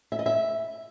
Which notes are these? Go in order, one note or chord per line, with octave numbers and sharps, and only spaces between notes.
E5
D#5
E5